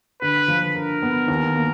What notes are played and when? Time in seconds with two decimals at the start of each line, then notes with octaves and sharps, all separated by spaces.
0.21 D3 B4
0.48 F3
0.75 D3 A#4
1.03 B3
1.28 D#2
1.56 A#3